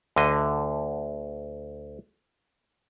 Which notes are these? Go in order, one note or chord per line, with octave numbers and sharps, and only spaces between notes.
D2 D3 D#5